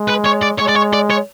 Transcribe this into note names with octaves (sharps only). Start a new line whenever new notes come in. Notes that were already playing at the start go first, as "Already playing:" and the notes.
Already playing: G#3
B4
C#5
D5
G#3 C#5
D5
C#5
D5
C#5